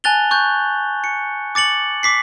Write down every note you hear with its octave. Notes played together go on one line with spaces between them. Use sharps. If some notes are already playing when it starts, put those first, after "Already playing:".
G#5 A5 F#6 A6 F7 G7
C#6 F#6 G6
C#7
D6 A6 C#7 F#7
D6 B6 C7